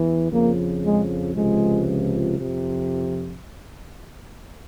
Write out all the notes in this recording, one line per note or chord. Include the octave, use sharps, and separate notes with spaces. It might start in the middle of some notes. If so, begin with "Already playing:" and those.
Already playing: E2 E3
F2 C#3 F3 A#3
G#3
C#2 C3 F3 G#3
F2 C3 F3